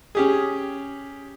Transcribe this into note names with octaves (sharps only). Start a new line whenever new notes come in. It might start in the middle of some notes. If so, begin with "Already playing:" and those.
C#4 G4 G#4